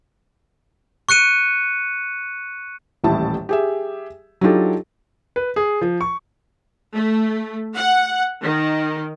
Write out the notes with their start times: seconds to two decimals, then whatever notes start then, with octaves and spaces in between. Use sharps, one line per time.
1.09 C#6 F#6 C#7 D#7
3.04 D#1 A1 A2 E4 A5
3.49 G4 G#4 E5
4.41 F#3 D4 D#4 F4 G4 A4
5.36 B4
5.56 G#4
5.81 F3
6.01 C#6
6.95 A3
7.76 F#5
8.43 D#3